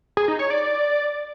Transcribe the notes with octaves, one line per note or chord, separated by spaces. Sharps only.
G#4
D#4
C#5
D5